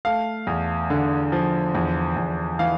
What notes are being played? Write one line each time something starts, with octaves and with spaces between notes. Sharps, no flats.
A3 F5
E2
D3
F3
E2
E2
E3 F5